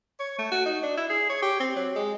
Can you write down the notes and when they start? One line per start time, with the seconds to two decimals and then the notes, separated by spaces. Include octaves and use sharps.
0.20 C#5
0.39 A3
0.52 F#4
0.66 D#4
0.83 D4
0.97 E4
1.10 G#4
1.30 C#5
1.42 G4
1.60 C4
1.76 F#3
1.96 G#3